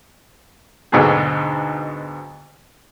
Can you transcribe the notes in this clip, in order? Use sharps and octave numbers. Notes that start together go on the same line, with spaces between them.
D2 G#2 B2 D3 F#3 G#4